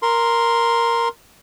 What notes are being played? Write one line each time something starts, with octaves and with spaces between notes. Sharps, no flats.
A#4 C6